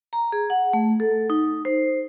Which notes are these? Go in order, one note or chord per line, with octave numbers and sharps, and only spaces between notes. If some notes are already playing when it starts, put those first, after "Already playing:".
A#5
G#4
F#5
A3
A4
D#4
C5